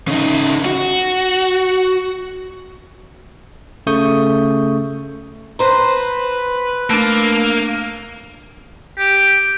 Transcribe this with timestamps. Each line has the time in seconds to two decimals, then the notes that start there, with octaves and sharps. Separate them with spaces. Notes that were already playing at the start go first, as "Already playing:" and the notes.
0.07 C#3 D#4
0.65 F#4
3.87 C#3 A3 C#6 D#6 G6
5.59 B4 C5 A#5
6.90 A3 A#3 D4
8.98 G4